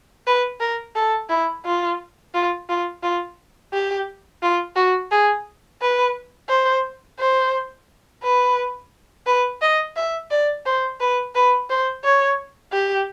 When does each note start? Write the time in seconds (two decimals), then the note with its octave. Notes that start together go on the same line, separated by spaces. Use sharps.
0.27 B4
0.61 A#4
0.95 A4
1.29 E4
1.65 F4
2.34 F4
2.69 F4
3.03 F4
3.73 G4
4.42 F4
4.76 F#4
5.11 G#4
5.81 B4
6.49 C5
7.19 C5
8.23 B4
9.26 B4
9.61 D#5
9.96 E5
10.31 D5
10.66 C5
11.00 B4
11.35 B4
11.70 C5
12.04 C#5
12.73 G4